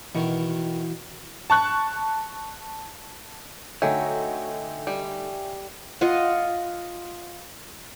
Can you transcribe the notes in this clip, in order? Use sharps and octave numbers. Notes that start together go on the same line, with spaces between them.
B2 D#3 E3 E4 F#4
A5 C#6 F#6
D3 F#3 A3 D#4 E5 G5 G#5
G3
F4 D#5 F5 F#5